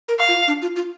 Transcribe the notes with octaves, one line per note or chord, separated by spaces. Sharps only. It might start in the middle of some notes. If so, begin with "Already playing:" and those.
A#4
F5
F4
D4
F4
F4